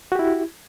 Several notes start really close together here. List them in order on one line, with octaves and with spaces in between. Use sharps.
F#4 G4 E4